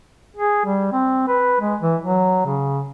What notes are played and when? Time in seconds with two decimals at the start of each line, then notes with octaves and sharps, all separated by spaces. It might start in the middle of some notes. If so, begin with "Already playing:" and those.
0.36 G#4
0.65 G3
0.92 C4
1.28 B4
1.60 G#3
1.80 E3
2.01 F#3
2.46 C#3